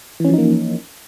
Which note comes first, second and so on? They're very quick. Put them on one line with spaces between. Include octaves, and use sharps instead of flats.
E3 C#4 F3 D#4 A#3